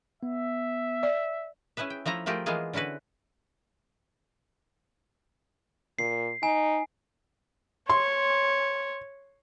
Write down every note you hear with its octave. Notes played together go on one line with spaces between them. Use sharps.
B3 E5
D5
C#4 E4 G#4 B4 E5
G5
F3 A3 E4 A#5
F3 A3 F4 G4 G#4 A#4
E3 G#3 A#3 B3 F4 G#4
D3 C#4 E4 F#4 B4
A#2 C7
D#4 G#5
C#5 C6